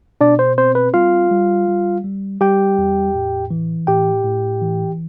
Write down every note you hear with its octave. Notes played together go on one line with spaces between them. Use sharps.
B2 D4 D5
C5
C4 C5
B4
G3 F4 F5
G3
G3
G3
G3 G4 G5
E2
A2
E3
A2 G4 G5
A2
E3